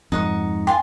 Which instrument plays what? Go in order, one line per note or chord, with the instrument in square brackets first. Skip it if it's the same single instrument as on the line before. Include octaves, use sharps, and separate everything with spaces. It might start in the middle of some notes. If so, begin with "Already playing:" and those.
[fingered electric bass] F2 G#2 [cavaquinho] D#4 F#5 C#6
[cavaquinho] F4 G#5 C6 [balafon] G5